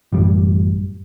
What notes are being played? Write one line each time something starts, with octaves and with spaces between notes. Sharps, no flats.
A1 F#2 G3